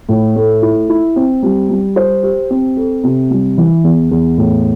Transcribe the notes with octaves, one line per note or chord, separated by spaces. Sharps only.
A2
A3
E4
E4
C4
G3
G3
C5
G4
C4
A4
C3
G3
E3
E2
E2
A2